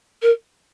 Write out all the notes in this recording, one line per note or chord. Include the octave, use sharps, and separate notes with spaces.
A#4